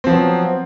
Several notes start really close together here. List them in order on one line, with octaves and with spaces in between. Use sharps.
C4 F3 B3 F#3